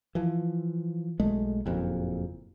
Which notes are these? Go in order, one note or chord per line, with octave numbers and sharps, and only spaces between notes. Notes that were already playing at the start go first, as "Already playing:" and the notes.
E3 F3
B1 G#3 A3
F#1 F2 A#2